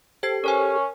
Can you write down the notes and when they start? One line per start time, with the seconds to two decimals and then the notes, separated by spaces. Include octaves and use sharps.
0.23 G4 A4 C5 G#6 C7
0.44 C#4 A#4 C#5 G#5